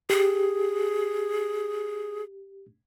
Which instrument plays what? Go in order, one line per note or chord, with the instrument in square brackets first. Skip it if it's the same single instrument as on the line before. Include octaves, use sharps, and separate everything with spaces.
[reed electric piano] G4 [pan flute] G#4